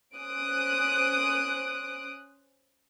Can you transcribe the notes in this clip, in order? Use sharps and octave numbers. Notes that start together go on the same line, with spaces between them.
C#4 C5 D#6 F#6 D7